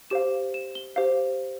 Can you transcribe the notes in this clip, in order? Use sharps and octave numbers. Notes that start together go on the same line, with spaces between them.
G4 C5 F5 E7
E7
G7
G4 C5 F5